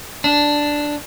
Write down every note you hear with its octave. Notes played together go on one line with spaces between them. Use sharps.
D4